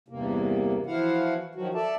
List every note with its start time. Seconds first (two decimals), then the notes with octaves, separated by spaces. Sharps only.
0.08 E2 G2 C3 A#3
0.86 E3 F3 E4 F#4 F5 F#5
1.55 D#3 F3 F#3 F#4
1.74 A4 D5 E5 A5